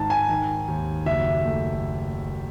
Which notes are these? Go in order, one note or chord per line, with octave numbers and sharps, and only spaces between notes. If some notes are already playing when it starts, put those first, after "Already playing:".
Already playing: G#2 D#3 A5
G#5
D#3
D#2
F#1 E5
A3